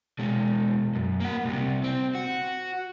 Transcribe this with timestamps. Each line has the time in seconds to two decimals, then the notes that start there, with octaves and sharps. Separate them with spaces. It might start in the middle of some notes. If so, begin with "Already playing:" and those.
0.19 B2 G#3
0.95 F#2
1.20 A#3 F#5
1.45 C2 C3
1.84 C4
2.15 F#4